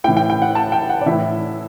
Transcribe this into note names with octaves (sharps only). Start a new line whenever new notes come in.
A2 E3 G5
G5
G5
F#5
A5
G5
F#5
D5
A2 E3 E5